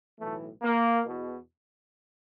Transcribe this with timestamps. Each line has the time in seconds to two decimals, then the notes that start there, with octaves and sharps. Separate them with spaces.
0.19 B1 A2 E3 A3
0.62 A#3
1.06 E2 B2